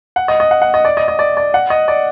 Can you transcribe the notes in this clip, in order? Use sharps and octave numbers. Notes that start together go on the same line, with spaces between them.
F#5
D#5
D#5
F#5
F#5
D#5
D5
D#5
D#5
D5
D5
F#5
D#5
D5